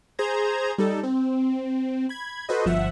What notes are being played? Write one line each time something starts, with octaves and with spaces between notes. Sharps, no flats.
G#4 C5 A#5 G#6
G3 D#4 A4
C4
B5 G#6
F#4 A4 B4 C5 D#5
G1 F3 E5 F#5